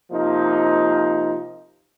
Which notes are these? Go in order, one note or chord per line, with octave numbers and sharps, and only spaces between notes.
C3 F3 A#3 D#4